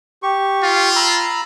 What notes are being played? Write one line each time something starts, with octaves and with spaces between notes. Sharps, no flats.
G4 C#6
F4
A#5 B5 E6